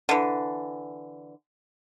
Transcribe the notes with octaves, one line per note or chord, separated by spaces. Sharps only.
D3 E3